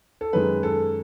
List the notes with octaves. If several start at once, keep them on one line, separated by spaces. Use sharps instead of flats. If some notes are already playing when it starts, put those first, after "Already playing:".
A4
F#2 D#3 G#3 B4
A4